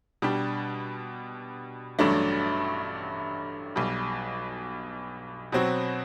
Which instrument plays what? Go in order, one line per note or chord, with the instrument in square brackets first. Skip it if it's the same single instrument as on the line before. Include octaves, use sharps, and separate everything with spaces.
[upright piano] B2 G3 D4 G4
A1 G2 F#3 A3 D4
B1 B2 G3
B2 F#3 C4 F#4